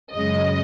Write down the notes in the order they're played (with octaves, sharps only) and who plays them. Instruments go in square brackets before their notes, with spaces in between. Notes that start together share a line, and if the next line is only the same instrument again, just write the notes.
[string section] F#2 C#3 G#3 D#5